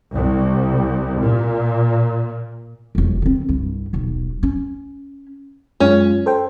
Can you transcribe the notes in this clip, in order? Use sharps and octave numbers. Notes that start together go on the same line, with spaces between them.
C2
A#2
E1 F2
D3 C4
C2 G2
D#1 B1
C#4
F#2 G#3 C#4 F4
A4 C5 G5